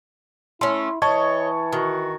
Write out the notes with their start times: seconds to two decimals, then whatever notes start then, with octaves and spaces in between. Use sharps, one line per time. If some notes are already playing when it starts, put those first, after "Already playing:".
0.61 A3 C#4 E4 C6
1.02 E3 C#5 D#5 A5 C#6 G#6
1.73 D#3 F#4